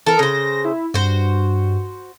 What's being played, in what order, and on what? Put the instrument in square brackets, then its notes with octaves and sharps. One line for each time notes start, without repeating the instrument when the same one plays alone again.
[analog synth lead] E3 [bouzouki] A4 A#4
[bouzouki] C#3 C5 [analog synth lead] A#6
[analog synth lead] E4
[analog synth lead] G2 [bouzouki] F#4 C5